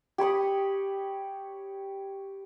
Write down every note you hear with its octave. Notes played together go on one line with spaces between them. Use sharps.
G4 C#5 B5 D#6